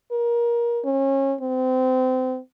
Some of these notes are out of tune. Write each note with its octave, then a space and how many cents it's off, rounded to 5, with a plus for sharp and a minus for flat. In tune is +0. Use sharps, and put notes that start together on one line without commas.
A#4 +20
C#4 -30
C4 -30